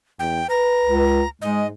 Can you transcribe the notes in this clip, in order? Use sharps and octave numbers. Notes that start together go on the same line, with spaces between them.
E2 G5
B4 A#5
C#2
G#2 G#3 D#5